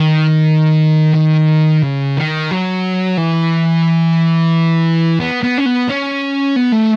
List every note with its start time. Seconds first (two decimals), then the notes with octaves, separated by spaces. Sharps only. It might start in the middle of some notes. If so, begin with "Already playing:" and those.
Already playing: D#3
1.15 D#3
1.83 C#3
2.17 D#3
2.51 F#3
3.17 E3
5.20 B3
5.43 B3
5.58 C#4
5.66 B3
5.89 C#4
6.56 B3
6.72 A3